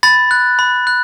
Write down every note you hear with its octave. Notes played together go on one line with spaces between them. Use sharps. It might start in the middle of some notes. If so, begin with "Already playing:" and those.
B5 A6
F#6
B5
F#6